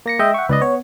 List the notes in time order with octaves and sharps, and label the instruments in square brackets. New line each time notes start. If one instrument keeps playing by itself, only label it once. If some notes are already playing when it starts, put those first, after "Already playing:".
[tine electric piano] A#3 A#6 C#7
[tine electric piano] G#3 D#5 [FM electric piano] E5 G5
[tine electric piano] F#5 C#6
[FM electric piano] C#2 [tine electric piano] B4 D5 D#5
[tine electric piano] B3 [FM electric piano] C#5